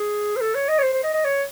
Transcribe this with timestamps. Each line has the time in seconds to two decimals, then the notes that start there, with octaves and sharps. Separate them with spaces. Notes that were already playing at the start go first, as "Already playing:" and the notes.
Already playing: G#4
0.37 C5
0.41 A4
0.55 C#5
0.68 D#5
0.79 C#5
0.83 C5
0.93 C5
1.04 D#5
1.14 D#5
1.25 C#5